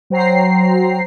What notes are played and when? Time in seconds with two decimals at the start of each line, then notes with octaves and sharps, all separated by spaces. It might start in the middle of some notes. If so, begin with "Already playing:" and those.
0.10 F#3 C5 G5 A#5 C7